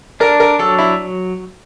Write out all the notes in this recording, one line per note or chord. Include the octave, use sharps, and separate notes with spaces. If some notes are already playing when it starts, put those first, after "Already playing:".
D4 A#4
A#4
F#3 A4
E4